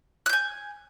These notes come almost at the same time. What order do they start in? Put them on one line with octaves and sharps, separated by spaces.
F#6 G6 G#5